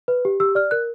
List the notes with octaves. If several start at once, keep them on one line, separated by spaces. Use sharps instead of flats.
B4
G4
G4 E6
D5 F6
A#4 F#6